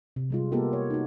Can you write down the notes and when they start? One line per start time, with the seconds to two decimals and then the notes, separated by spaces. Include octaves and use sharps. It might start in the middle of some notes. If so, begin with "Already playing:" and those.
0.16 C3
0.30 G3 G#3 F4
0.52 A#3 B3 F4 G4 A4 A#4
0.73 C#5
0.90 D#4 F#4